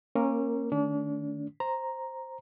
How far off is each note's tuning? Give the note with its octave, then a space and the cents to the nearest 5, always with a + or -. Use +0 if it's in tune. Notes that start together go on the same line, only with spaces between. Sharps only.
A#3 -5 C#4 -25 A#4 +0
D#3 -35 A3 +0 D4 -40
C5 +5 A#5 +0